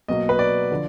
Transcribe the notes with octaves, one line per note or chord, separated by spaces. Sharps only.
B2 F#3 A#3 D#5
B4
D5
D3 F3